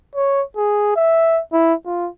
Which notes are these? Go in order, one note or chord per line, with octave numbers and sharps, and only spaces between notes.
C#5
G#4
E5
E4
F4